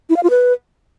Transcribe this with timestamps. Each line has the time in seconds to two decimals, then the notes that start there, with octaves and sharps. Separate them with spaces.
0.10 E4
0.16 F5
0.23 F4
0.30 B4